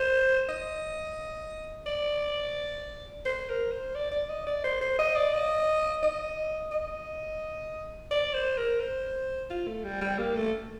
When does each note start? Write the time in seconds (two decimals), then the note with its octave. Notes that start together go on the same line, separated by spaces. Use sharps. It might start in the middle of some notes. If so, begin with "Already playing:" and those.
Already playing: C5
0.49 D#5
1.87 D5
3.25 C5
3.49 A#4
3.72 C5
3.95 D5
4.12 D5
4.30 D#5
4.47 D5
4.64 C5
4.81 C5
4.99 D#5
5.16 D5
5.34 D#5
6.03 D#5
6.72 D#5
8.11 D5
8.34 C5
8.58 A#4
8.81 C5
9.50 F4
9.67 A3
9.84 G3
10.02 G3
10.18 A#3
10.36 A3